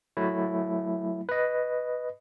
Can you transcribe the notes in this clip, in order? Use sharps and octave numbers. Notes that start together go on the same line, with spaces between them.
F#3 A3 E4
B4 D#5